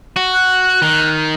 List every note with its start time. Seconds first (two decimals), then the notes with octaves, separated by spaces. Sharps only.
0.16 F#4
0.34 F#6
0.82 D#3